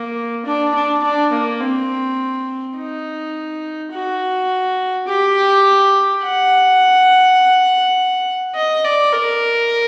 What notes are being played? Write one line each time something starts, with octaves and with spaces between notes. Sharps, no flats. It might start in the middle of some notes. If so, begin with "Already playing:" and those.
Already playing: A#3
D4
D4
D4
A#3
C4
D#4
F#4
G4
F#5
D#5
D5
A#4